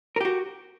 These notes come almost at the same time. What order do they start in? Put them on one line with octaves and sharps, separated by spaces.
A#4 G4 F#4